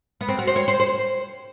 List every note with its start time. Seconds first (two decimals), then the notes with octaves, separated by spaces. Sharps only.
0.21 B3
0.28 C4
0.39 F#4
0.47 C5
0.56 C#5
0.68 C5
0.80 C5